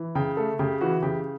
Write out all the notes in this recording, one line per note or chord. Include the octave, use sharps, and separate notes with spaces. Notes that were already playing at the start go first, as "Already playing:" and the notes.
Already playing: E3
C#3 G5
A3 A4
C#3 G4
E3 F#4
C#3 G4